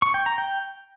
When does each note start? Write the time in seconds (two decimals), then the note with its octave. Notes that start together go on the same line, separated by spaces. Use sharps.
0.02 C#6
0.14 G5
0.26 A#5
0.38 G5